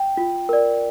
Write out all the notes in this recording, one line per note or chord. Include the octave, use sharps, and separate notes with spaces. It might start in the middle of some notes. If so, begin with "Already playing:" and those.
Already playing: G5
F4
A#4 D5